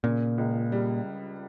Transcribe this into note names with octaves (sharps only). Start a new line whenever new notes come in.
A#2 C#3
C#2
G3